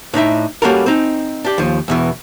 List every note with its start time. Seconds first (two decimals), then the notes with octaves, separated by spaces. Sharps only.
0.14 A2 D4 D#4 E5
0.62 G3 A#3 C#4 F#4 A4 A#4
0.86 C4 D#4
1.45 D4 G4
1.58 D#2 F3
1.88 E2 B2 E3